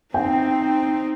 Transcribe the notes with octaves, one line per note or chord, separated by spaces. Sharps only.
C4 D#4 G5